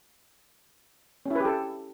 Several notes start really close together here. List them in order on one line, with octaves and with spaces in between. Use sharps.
C#4 E4 B4 G4 A4